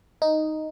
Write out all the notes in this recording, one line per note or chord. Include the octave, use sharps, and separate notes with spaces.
D#4